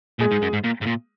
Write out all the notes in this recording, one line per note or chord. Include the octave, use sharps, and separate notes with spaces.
A#2 G#3 G#4
G#2
F#2
G#2
A#2
G#2
A#2